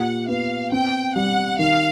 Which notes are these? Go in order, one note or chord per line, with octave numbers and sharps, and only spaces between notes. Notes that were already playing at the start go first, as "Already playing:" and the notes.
Already playing: A#2 G4 F#5
B3 F5
C4 G5
G3 F#5
D#3 F5